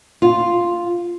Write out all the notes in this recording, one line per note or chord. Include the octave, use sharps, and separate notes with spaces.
F4